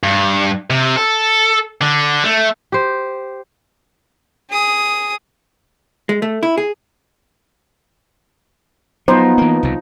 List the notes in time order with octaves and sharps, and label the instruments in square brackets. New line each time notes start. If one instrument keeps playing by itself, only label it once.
[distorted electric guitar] G2
C3
A4
D3
A3
[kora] G4 C5
[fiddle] G#4 D#6
[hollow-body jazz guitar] G#3
A3
E4
G#4
[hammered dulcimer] F3 D#4 [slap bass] F#3 [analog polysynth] B3 [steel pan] C5
[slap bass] E3 A#3
C2 B2